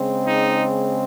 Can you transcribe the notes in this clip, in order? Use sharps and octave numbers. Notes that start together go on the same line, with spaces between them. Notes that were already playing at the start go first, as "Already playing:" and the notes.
Already playing: C#3 G#3 C4
D#4